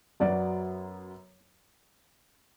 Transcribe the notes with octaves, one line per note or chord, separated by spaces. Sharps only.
F#2 F#3 B3 D5